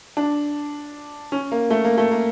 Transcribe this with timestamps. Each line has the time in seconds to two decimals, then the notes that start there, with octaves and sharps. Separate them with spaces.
0.17 D4
1.32 C#4
1.52 A#3
1.70 A3
1.85 A#3
1.98 A3
2.11 A#3